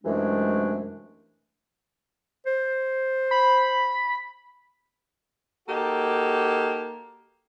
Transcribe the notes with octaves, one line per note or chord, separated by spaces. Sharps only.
F#2 C3 E3 G#3 A3 D4
C5
B5
A#3 D#4 F#4 G4 A4